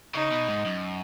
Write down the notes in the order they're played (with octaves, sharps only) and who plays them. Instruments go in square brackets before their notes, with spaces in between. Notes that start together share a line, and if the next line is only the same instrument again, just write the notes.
[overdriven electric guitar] C#3 [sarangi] D#4
[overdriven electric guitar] B2
G#2
F#2